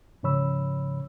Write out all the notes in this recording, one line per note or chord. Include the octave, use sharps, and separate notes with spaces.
G#2 C#3 F3 C#5 B5 E6